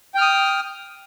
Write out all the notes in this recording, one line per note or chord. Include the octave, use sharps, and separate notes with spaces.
G5 D#6 F6